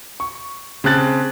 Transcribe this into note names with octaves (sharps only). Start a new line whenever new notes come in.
C#6
C#3 C4 A5 F#6 A6